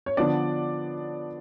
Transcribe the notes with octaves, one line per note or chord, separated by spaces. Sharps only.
C#5
D3 F3 B3 D4 D5